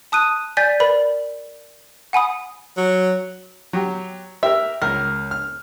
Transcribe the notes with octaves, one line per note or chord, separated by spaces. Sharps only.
A5 D#6 F#6 D#7
D5 G#5 G6 A6 B6
A#4 B4 D5 B5
F#5 G#5 B5 D#6
F#3
F#3 G4
G4 A#4 E5
C#2 A#4
F6